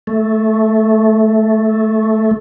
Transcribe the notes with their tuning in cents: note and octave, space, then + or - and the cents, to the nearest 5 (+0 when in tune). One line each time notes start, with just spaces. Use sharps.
A3 -10